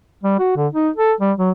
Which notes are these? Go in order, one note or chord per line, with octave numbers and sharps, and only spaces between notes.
G3
F#4
D3
D#4
A4
G3
F#3